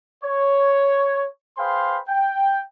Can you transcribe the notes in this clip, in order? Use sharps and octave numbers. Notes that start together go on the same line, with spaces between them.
C#5
G#4 B4 C5 F5 G5 C6
G5